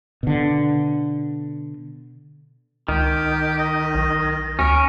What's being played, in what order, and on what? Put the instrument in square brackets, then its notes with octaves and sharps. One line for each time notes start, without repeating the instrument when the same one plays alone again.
[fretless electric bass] B2 D3
[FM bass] C#2 [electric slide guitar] D#3 [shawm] G4
[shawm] D#5
[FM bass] B1
[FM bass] D2 [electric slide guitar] C#4 [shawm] A#4